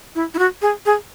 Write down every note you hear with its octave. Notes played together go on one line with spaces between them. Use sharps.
E4
E4
F#4
G#4
G#4